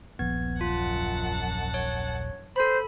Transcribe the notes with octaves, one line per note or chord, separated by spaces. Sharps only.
D#1 A#1 F3 B3 G#6
F#2 F4 F#5 A5
C#5
A4 C5 B5